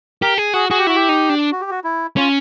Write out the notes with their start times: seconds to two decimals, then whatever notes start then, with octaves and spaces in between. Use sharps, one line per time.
0.22 G4 A#4
0.38 G#4
0.54 F#4 G#4
0.70 F#4 G#4
0.78 G4
0.87 E4 F#4
0.96 G4
1.09 D#4
1.30 D4
1.52 F#4
1.61 G4
1.71 F#4
1.84 E4
2.17 C#4 F4